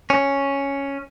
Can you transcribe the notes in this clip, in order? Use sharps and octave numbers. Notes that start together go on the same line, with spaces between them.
C#4